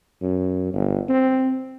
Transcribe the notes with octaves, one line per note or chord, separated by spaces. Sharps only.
F#2
G1
C4